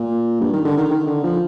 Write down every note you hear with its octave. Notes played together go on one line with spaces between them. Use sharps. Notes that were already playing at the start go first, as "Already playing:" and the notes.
Already playing: A#2
G2
D#3
D3
D#3
D#3
D3
F3